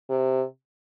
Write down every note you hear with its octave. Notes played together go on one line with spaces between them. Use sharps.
C3